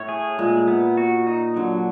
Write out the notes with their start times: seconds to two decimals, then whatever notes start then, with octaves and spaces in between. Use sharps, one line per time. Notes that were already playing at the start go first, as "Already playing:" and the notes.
Already playing: A2 C#5
0.09 G#4
0.39 A#2 G#3
0.68 B3
0.97 F#4
1.27 D#4
1.56 D3 F#3